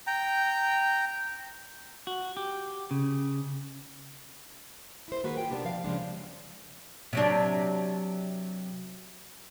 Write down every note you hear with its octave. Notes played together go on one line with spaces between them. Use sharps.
G5 A#5
F#4
G4
C#3
E4 C5
D#3 A#3 F#4 G#4 B4
F4 G5
C3 D#3 G3 B3 D4 G4
F3 F5
C#3 F3 G#3 D4
C3 F#3 D4